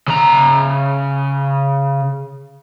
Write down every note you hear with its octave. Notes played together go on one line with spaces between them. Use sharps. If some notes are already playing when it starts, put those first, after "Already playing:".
C#3 A#5